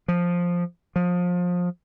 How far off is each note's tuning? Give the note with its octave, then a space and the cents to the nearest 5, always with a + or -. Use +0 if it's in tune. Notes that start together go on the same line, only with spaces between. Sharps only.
F3 +5
F3 +25